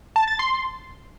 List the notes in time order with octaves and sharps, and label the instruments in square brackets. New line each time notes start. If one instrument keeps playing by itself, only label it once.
[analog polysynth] A5
A6
C6